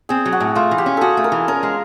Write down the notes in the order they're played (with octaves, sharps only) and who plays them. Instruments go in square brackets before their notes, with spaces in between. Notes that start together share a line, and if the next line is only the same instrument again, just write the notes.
[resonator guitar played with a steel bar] C4 [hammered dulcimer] G#4
[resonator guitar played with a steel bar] F#3
[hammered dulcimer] F#4
[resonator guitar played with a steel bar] A2
[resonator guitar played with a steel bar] A3 [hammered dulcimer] F4
[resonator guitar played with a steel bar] E3
[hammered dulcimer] G4
[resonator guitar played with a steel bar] C#4
[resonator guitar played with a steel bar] F#4 [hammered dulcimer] G#4 A4
[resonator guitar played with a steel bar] A3
[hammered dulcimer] A#4
[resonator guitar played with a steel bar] E3
[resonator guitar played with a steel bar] C#4 [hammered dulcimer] A#4
[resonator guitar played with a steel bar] G#3